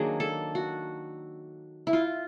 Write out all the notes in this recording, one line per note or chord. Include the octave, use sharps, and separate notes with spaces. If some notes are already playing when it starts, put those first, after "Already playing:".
Already playing: D#3 F#3 A#3 D4 G#4
A4
F#4
E4
F4